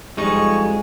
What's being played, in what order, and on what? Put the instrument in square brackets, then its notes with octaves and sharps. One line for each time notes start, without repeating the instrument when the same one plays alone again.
[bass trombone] F2 [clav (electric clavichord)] G3 D#4 [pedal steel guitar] G#3 [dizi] C#6